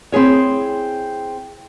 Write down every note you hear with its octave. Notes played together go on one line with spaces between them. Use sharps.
C4 E4 G#4 C#5